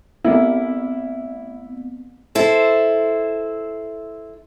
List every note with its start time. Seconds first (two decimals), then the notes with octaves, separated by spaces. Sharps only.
0.25 A3 B3 C4 E4
2.35 E4 A4 C5